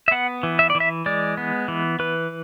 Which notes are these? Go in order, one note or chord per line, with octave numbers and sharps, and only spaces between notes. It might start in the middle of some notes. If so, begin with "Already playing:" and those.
E5
B3 F#5
E3
E5
D5
E3
E5
G#3 D5
B3
E3
E3 B4